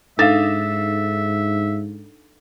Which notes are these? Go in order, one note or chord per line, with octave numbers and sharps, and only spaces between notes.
G#2 D4 D#4 A4 E5 F5 A6